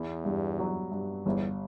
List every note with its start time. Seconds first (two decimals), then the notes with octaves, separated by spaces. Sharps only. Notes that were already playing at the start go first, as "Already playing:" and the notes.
Already playing: E2 B3
0.25 G2
0.58 F#3
0.92 G2
1.26 G1 E2